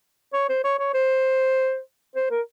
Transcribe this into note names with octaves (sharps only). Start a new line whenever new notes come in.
C#5
C5
C#5
C#5
C5
C5
A#4